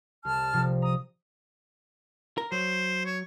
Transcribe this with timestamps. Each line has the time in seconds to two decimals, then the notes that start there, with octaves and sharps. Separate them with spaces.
0.25 C2 A5 F6
0.53 C3 F3
0.82 A#5 D#6
2.38 A#4
2.52 F#3 C5
3.06 C#5